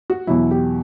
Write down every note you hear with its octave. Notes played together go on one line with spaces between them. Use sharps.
F#4
E2 B2 F#3 E4
G4